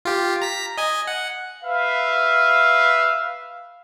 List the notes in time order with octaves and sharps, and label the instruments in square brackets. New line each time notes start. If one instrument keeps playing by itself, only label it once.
[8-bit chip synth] F4 G4
A#5 B6
D#5 G#5
F#5
[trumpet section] B4 E5 F5